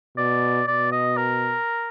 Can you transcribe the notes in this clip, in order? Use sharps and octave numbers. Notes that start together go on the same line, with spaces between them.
B2 D5
B2 D5
D#5
A#4